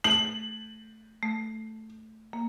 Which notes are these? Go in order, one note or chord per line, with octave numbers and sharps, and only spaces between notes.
A3 F#7
A3
A#3